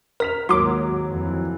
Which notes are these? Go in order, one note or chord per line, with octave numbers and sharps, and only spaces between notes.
A#4 F6 B6 F7
D#2 G#2 F#3 C6 D6
F2 E3